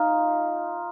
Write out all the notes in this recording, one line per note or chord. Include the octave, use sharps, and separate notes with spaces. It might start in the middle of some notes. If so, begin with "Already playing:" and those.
Already playing: D#4 F4